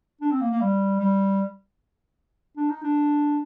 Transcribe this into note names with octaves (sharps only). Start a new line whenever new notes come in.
D4
C4
A#3
A#3
G3
G3
D4
D#4
D4